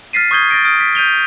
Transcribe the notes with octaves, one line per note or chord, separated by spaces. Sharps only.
F6 A6 B6 C7 D#7
C#6 D#6 G6 G#6 G7
A6 A#6 D7
D#6 F6 D7
B6
G6 D#7 F7 G7